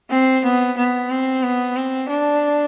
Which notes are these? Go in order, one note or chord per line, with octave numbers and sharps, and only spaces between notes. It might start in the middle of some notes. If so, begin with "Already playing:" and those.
C4
B3
B3
C4
B3
C4
D4